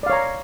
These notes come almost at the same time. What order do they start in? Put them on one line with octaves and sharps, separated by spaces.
D5 F5 C#5 A#5